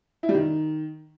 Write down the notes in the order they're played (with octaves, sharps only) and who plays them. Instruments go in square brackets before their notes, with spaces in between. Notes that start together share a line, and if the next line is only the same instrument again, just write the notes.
[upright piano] E4
G3
D#3